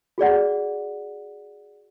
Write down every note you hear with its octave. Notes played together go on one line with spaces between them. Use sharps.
F#4 G#4 D5 F#5